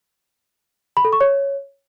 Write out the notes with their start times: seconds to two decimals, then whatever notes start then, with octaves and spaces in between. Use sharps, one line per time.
0.97 B5
1.05 A4
1.13 C#6
1.21 C#5